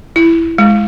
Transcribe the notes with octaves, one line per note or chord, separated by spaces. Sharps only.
E4
G#3